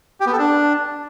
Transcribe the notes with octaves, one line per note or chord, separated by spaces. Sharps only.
G4
B3
A4
D4